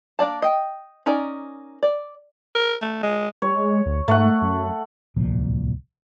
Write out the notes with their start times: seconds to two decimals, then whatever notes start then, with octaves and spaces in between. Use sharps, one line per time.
0.19 A#3 D4 D5 A5
0.42 D#5 G5
1.06 C#4 D#4 A#4 D5
1.83 D5
2.55 A#4
2.82 A3
3.03 G#3
3.42 G3 C#5
3.55 G#3
3.86 D2
4.08 G#2 A3 F#5
4.42 F#2
5.16 D1 C2 A#2 F3